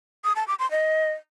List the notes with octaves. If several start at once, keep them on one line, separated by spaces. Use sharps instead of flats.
D#6
A5
D6
C6
D#5